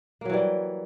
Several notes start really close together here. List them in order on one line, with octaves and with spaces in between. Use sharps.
A#3 F#3 E3 G3